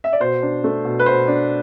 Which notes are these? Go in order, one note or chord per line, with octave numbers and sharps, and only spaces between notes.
E5
D5
B2 C5
D4
A3
B2
B4
B2 C5
D4